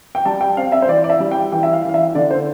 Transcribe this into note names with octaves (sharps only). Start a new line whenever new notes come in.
G5
G3 A5
G5
C4 F5
E5
C5
E3 D5
D5
E5
G3
G5
E3 G5
E5
F5
E3
F5
E5
D3 D5
C5